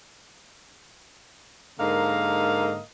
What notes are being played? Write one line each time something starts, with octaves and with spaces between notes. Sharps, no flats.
G#2 D3 A#3 A#4 D#5 F5